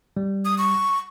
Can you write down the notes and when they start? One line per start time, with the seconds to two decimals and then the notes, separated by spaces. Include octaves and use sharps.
0.17 G3
0.45 D#6
0.58 C#6